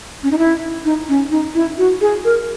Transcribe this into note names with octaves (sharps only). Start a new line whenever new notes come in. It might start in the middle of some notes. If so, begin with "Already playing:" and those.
C#4
D#4
E4
D#4
C#4
D#4
E4
F#4
G#4
A#4